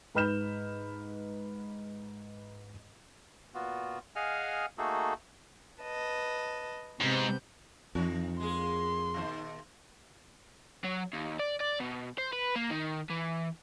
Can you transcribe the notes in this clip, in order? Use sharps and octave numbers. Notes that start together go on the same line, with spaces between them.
G#2 B4 B5 F6 G6 E7
A#2 B3 F4 F#4
G#4 D#5 F5 F#5 G#5 F6
A3 A#3 D#4 F#4 G#4 A4
B4 D#5 A5
G#2 C3 B3 G6
F2 E3 C4 D#4
G#3 A#3 G#4 C6
A#2 D#3 C5
F#3
D#2
D5
D5
B2
C5
B4
A#3
D#3
E3